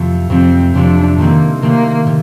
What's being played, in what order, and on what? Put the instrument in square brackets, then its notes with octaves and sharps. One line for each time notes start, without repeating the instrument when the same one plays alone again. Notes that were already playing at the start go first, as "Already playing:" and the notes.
Already playing: [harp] F2 C3 F3 A3
[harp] F2 C3 F3 A3 [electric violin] C4
[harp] F2 C3 F3 A3 [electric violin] D4
[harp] C3 D#3 A3 C4 [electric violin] A#3
[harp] C3 D#3 A3 C4 [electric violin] A#3
[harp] C3